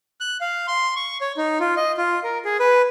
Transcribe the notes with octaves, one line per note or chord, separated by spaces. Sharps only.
F#6
F5
C6
C#6
C#5
D#4
F4
D#5
F4
A#4
G#4
B4